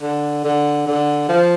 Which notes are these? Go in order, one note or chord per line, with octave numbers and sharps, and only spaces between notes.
D3
D3
D3
F3